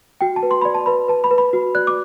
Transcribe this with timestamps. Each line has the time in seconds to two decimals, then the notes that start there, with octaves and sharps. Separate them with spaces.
0.21 F#4 G5
0.36 A5
0.43 B4
0.51 C6
0.62 D5 B5
0.75 A5
0.86 B4 B5
1.08 B4 A5
1.24 B5
1.31 B4
1.38 B5
1.53 F#4
1.75 D5 F#6
1.87 D6